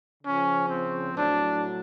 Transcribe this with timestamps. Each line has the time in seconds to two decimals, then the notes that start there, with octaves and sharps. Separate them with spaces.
0.23 C#3 F3 C#4
0.69 C4
1.14 A2 F#3 D4